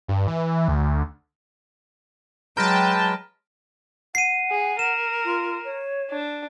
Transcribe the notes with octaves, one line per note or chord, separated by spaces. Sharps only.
G2
E3
D2
F#3 G#3 B4 G5 A5 A#5 F6 A#6
F#5 C7 D#7
G#4
A#4 E7
F4
C#5
D4